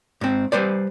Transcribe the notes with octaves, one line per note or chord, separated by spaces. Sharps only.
G#2 C4
G3 B4 C5 D5